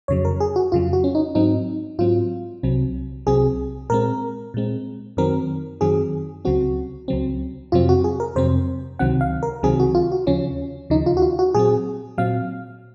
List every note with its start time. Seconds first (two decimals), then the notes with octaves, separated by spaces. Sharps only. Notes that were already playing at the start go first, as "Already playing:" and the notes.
0.08 F2 C#3 F#3 C#5
0.25 A#4
0.40 G#4
0.56 F#4
0.72 F2 C#3 F#3 F4
0.93 F#4
1.04 C#4
1.15 D#4
1.35 G#2 F#3 C4 D#4
1.99 G#2 F#3 C4 F4
2.63 C2 C3 F#3 C4
3.27 C2 C3 F#3 C4 G#4
3.90 A#2 G#3 C4 A#4
4.54 A#2 G#3 C4
5.17 F#2 D#3 F#3 C4 A#4
5.81 F#2 D#3 F#3 C4 G#4
6.45 C#2 C#3 F#3 C4 F#4
7.08 C#2 C#3 F#3 C4
7.72 F2 C3 F#3 C4 F4
7.89 F#4
8.04 G#4
8.20 A#4
8.36 F2 C3 F#3 C4 C5
8.99 C#2 C3 D#3 F#3 C4 F#5
9.21 F5
9.43 A#4
9.63 C#2 C3 D#3 F#3 C4 G#4
9.80 F#4
9.95 F4
10.12 F#4
10.27 D#2 C#3 F3 C#4
10.90 D#2 C#3 F3 D#4
11.06 F4
11.17 F#4
11.22 F4
11.39 F#4
11.54 A#2 F#3 C4 G#4
12.18 A#2 F#3 C4 F5